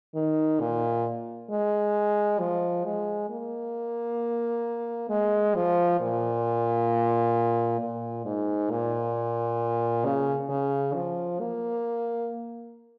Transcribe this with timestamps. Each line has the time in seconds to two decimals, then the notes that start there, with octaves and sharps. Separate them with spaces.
0.15 D#3
0.60 A#2
1.50 G#3
2.39 F3
2.85 G#3
3.29 A#3
5.10 G#3
5.55 F3
6.00 A#2
7.80 A#2
8.25 G#2
8.70 A#2
10.05 C#3
10.49 C#3
10.94 F3
11.40 A#3